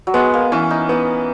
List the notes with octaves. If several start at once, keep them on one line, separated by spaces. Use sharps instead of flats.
F#3
G#3 B3
A#3
E3 C#4
D#4
B3 D#4